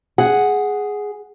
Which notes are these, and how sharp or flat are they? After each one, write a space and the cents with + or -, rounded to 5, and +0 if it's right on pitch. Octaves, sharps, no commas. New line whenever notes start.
G#4 +0 F#5 +0